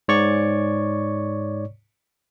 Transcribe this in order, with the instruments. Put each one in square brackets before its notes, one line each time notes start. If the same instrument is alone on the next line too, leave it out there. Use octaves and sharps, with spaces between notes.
[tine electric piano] G#2 C#5 D5 C#6